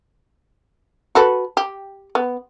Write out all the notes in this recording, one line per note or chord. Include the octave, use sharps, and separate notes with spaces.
F#4 A4 B4
G4
B3